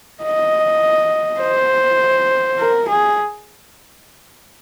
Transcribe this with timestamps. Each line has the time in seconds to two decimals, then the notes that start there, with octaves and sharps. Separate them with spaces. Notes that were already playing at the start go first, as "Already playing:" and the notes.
0.23 D#5
1.41 C5
2.59 A#4
2.88 G#4